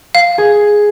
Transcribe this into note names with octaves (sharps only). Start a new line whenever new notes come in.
F5
G#4